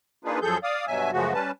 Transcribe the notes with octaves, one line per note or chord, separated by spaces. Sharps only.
A#3 D4 D#4 F4 G#4 B4
F#2 F3 G#4 A4 G6
D5 F5 D#6
G2 B2 F#3 E5 G#5
F#2 C#3 F3 G#3 A3 F#4
G3 C#4 B4 A5